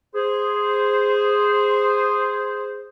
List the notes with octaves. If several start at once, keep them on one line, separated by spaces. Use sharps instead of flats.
G#4 C5